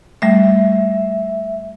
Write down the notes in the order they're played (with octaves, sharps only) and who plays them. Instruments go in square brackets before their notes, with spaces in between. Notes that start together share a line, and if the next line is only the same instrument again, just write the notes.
[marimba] G3 A3 [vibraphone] E5